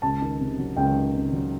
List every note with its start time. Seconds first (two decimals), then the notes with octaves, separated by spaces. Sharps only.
0.02 C#2 A5
0.21 D#3
0.40 C3
0.58 F#3
0.77 C#2 G5
0.95 D#3
1.15 C3
1.33 F#3